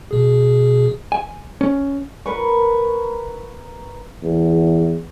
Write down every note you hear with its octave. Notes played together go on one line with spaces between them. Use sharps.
B2 G#4
G#5
C#4
A#4 B4 C#6
E2